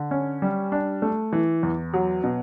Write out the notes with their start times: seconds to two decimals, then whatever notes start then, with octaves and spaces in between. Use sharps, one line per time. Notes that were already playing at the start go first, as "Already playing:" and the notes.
Already playing: D3
0.11 C#4
0.42 G3
0.72 D4
1.02 A3
1.33 E3
1.63 E2
1.93 F#3
2.24 B2